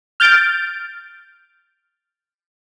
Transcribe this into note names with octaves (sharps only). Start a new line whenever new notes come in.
F6 G6 A6 D7